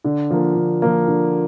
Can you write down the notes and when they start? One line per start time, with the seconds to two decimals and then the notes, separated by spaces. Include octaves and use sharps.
0.04 D3
0.30 F3 A#3
0.55 D3
0.82 F3 A#3
1.08 D3